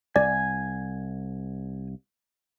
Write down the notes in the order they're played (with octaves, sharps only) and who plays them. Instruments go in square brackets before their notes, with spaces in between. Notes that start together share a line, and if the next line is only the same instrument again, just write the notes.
[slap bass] C2 [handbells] D5 [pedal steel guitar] G#5